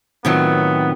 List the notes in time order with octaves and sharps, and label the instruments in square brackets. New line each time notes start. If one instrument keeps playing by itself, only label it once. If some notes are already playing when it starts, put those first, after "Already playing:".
[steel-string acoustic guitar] A2 D#3 F#3 [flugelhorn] B3 [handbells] C4 F4 A#4